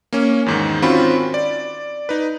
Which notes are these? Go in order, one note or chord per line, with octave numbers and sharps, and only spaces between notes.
A#3 C#4
E2 G#2 D#3
D#3 C4 C#4 F4 F#4 B5
D5
D#4 B4